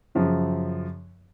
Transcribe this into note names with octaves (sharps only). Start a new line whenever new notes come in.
F#2 C#3 F3